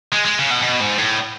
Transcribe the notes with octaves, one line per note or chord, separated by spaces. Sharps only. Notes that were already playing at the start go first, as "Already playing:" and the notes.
G#3
G#3
C#3
B2
B2
G#2
A2